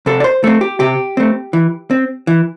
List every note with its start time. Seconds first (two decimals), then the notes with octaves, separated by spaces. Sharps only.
0.06 C3 A4
0.20 D5
0.24 C5
0.44 A3 C4 A4
0.61 G4
0.80 C3 G4
1.17 A3 C4
1.53 E3
1.91 C4
2.27 E3